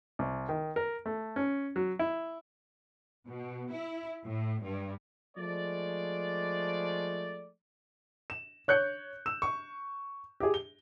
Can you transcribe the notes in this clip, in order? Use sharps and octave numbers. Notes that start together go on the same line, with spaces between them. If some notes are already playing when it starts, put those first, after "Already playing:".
C2
D#3
A#4
A3
C#4
F#3
E4
B2
E4
A2
G2
F3 G#3 A3 D5
E7
C#5 F#6 G6 C#7
E6 E7
C#6
G4 G#4
G7